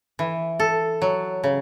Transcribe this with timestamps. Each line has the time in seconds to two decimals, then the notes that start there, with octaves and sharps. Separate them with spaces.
0.19 E3
0.60 A4
1.02 F#3
1.44 C#3